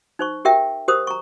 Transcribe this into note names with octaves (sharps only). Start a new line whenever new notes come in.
D#4 C5 C#6
G4 A#4 E5 G5
G4 A#4 C5 D#6
A#5 C#6